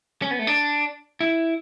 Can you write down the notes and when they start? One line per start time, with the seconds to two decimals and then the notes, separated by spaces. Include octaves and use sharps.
0.22 C#4
0.31 B3
0.39 A3
0.47 D4
1.20 E4